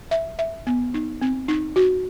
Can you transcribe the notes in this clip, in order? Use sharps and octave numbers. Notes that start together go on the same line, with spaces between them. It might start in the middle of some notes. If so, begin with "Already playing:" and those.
E5
E5
B3
D#4
C4
D#4
F#4